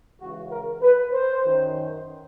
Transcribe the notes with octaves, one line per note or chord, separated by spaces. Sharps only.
C#2 C#3 E3 F#4
A#4
B4
C5
F#2 D#3